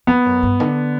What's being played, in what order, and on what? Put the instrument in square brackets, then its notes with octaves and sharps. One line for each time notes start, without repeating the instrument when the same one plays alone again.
[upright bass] E2 [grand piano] B3
[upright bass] F#2
G2
D3